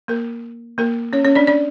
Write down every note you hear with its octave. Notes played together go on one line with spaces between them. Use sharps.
A#3 A#4
A#3 A#4
C#4 C#5
C#4 C#5
D4 D5
D4 D5